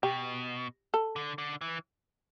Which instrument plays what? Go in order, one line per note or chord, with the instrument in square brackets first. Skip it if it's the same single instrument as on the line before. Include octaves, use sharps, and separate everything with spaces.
[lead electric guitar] B2 [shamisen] G4
[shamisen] A4
[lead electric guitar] D3
D3
E3